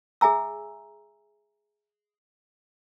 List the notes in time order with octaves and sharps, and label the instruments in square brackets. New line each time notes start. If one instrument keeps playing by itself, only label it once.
[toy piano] G#4 E5 G#5 A#5 E6